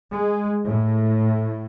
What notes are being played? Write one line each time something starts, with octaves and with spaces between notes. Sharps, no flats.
G#3
A2